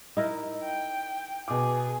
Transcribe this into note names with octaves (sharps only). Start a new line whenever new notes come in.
D#4 E4 A#4
G5
B2 G#4 D6